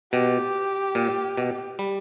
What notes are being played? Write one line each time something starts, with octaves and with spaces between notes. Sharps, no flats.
B2 G4
A#2
B2
G3